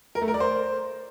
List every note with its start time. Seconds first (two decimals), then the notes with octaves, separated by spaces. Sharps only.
0.15 A#4
0.22 A3
0.28 A#4
0.34 D5
0.40 C5